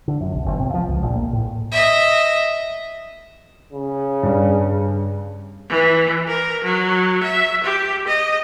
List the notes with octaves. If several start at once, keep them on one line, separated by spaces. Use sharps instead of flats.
D3
F#2
B1
G1
C3
F3
C#2
A#1
A#3
A2
D#5 E5
C#3
G2
E3
A#4
F#3
E5
G4
D#5